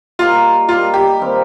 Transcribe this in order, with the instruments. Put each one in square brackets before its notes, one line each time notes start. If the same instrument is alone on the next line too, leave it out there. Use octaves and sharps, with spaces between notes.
[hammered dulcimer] G3 A#3 D#4 [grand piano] F4
[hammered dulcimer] G3 A#3 D#4 [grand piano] F4
[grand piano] G4
[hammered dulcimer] D#3 G3 C4 F4